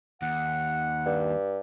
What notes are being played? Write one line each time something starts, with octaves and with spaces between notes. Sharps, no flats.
D#2 F#5
G2